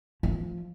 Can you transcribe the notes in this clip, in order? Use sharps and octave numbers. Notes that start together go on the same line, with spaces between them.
F3